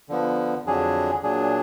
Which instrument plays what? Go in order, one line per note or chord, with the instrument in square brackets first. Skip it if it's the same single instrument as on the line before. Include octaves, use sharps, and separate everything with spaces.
[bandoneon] D3 F3 B3
F2 D3 F#3 D4 G#4
A#2 F#3 D4 G#4